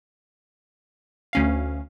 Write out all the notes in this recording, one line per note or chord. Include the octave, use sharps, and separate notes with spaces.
D2 C#4 F5